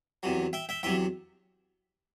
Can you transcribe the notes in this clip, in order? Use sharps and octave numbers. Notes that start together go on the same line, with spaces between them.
E2 C3 F#3
E5 G5
E5 G5
E2 C3 F#3 E5 G5